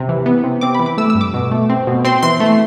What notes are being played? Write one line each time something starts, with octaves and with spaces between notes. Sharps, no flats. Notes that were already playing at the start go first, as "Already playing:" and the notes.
Already playing: C3
E3
B3
C3
C4 D6
E3 B5
D6
A3 E6
E6
G2
D6
B2
A3
C4
B2
C4 C6
E3 C6
A3